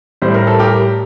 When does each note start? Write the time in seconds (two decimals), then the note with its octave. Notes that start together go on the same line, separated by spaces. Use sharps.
0.22 A2 G3 C5
0.34 A#4
0.47 A4
0.59 G4 A#4